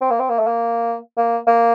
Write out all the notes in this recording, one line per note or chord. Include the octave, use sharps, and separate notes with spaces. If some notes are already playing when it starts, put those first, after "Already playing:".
C4
A#3
C4
A#3
A3
A#3
A#3
A#3